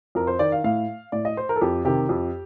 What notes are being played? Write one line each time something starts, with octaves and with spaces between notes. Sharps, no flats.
F2 A#4
C5
D#3 D5
F5
A2 F5
A2 D5
D#5
C5
A#4
A4
F2 G4
C3 D#3 G4
F2